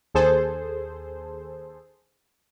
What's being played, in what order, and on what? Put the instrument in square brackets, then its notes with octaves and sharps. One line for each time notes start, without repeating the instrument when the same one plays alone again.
[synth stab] D#2 G#4 A4 C5